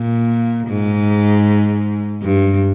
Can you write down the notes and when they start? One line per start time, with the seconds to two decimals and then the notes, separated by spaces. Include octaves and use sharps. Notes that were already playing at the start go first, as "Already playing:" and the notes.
Already playing: A#2
0.68 G#2
2.22 G2